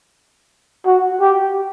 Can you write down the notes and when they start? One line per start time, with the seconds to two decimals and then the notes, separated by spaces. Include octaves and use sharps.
0.86 F#4
1.21 G4